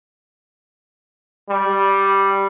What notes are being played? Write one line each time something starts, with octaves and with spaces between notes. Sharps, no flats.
G3